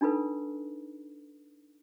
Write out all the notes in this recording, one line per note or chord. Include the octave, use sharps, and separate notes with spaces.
D4 D#4 F4 A4 B4